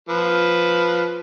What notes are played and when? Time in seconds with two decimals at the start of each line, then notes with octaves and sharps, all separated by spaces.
0.09 F3 B4